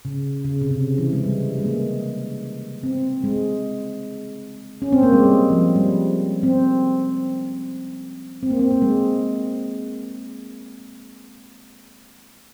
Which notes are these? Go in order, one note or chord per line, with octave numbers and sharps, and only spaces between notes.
C#3
C#3
C3
C#3
E3
G#3
G3
G#3
A#3
C4
G#3
C#4
C4
A#3
G#3
G3
F3
G3
C4
C4
A#3
C4
A#3
G#3